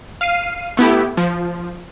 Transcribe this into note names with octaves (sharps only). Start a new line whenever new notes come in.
F5 C7 D#7
A3 B3 E4 G4
F3